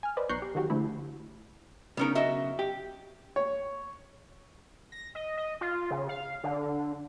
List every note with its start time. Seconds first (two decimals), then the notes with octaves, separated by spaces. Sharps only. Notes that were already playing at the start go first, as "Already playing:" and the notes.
0.03 G#5 F6
0.17 B4 C5 D5 D#5
0.29 B1 A#5 C#6 F#6 G6 C7
0.42 G4
0.55 D#3 F#3 F#4 G4
0.70 D3 F3 A3 E4
1.97 B1 C#3 B3 C#4 D#4 A#4
2.15 F#4 D#5 E5
2.59 G4
3.36 C#5
4.92 A#6
5.15 D#5
5.37 D#5
5.61 F4
5.91 C#3
6.09 F5
6.44 D3